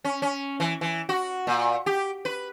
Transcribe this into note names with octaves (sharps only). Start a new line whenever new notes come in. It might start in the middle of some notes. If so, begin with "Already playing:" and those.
C#4
C#4
E3
E3
F#4
A#2
G4
B4